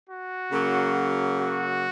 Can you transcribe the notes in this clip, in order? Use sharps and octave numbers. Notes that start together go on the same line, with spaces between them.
F#4
C#3 F#3 A#3
F#4